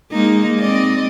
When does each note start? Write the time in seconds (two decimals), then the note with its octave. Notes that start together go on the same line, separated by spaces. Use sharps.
0.12 G#3 A#3 D#4
0.60 C4 D5 D#5